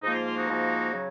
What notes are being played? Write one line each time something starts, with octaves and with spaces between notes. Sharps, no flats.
G#2 F3 A#3 D#4
F4
F4
D#4 F#4
G#2 F3 A#3
C#3 F#3